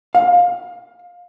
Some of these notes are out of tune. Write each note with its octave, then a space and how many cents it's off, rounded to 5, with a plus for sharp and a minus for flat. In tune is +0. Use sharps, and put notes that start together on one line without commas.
F5 +20